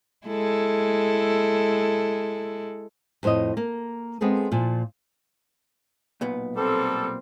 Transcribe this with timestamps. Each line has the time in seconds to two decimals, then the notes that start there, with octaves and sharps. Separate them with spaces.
0.27 G#3 E4 A4
3.23 F2 A2 C5 C#5 D#5
3.57 A#3
4.21 G#3 B3 C4 G#4 A4
4.51 A#2 F3
6.21 B1 A#2 B3
6.56 G3 A#3 C4 A4